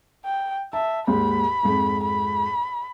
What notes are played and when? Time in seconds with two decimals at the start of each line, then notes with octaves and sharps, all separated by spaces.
0.25 G5
0.73 E5 A5
1.07 D#2 G#2 B5
1.63 F2 G#2
2.04 B5